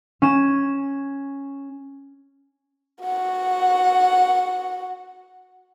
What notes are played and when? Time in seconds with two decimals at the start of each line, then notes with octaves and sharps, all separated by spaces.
0.22 C#4 E7
3.04 F#4 F#5